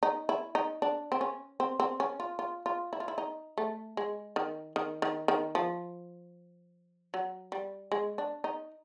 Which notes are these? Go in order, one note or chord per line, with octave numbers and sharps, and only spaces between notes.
D#4
E4
D#4
D4
C4
C#4
C4
C4
C#4
F4
F4
F4
E4
F4
E4
D#4
A3
G#3
D#3
D#3
D#3
D#3
F3
F#3
G3
G#3
D4
D#4